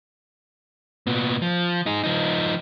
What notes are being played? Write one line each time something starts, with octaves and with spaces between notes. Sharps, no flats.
A#2 B3
F3
D#4 G#4
F3 D#4